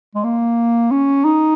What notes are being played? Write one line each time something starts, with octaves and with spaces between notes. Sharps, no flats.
G#3
A#3
C#4
D#4